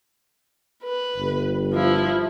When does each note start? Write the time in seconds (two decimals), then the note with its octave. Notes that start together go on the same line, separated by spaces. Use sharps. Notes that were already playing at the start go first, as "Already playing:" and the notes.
0.84 B4
1.17 G1
1.73 F3 E4